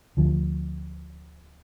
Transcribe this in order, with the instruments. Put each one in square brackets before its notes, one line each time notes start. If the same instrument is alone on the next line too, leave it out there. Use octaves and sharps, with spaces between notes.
[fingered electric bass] D2 D3 F3